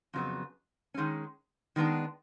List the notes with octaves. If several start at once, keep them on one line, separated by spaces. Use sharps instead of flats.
F2 C#3 F#3 B3
D#3 G#3 C#4
D#3 G#3 B3 D4